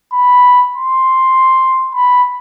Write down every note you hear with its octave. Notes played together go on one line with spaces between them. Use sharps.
B5
C6
B5